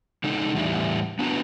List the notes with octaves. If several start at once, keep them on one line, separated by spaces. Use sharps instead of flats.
C#3 G#3 D#4 A4
E2 A2 G3 E4
B3 D4 F#4 B4 A#5